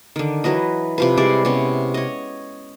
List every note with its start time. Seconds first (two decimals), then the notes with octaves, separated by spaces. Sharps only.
0.16 D3 D#3
0.44 E3 F#3 B4 D#5
0.98 C3 F3 B4
1.17 G3 G#3 E4 D5
1.45 C3 B3 C#4
1.94 C#5 D#5